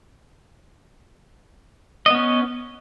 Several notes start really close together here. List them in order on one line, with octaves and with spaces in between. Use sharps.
D#5 B3 C#4